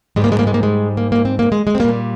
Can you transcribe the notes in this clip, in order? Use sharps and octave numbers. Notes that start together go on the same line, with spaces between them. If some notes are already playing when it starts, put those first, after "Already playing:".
G#2 G3 G#3
A#3
G#3
A#3
G#3
A#3
G#3
A#3
A#3
C4
A#3
G#3
G#3
C4
A#2 G3 A#3